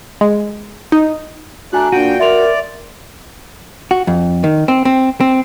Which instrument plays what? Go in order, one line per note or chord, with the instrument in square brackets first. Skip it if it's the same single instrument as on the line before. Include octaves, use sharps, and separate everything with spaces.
[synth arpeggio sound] G#3
D#4
[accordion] A3 D4 F#6 [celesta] F#4 G#5 A#5
[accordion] A#2 G5 [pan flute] D4 [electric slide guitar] F#4 [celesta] D#7
[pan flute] A#4 [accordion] D5 [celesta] E5 C6 F7
[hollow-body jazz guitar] F#4
F2
D#3
C4
C4
C4